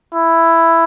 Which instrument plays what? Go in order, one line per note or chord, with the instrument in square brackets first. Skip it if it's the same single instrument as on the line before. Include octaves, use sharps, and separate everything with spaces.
[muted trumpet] E4